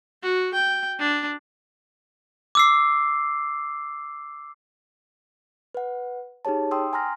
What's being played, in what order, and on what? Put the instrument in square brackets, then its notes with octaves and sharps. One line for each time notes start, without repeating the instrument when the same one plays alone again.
[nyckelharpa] F#4
G5
D4
[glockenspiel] D6 E6 C7
[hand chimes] B4 F#5
D#4 G4 G#4 C#5 A5
G5 C6 D#6 E6
G#5 A#5 C6 F6 A#6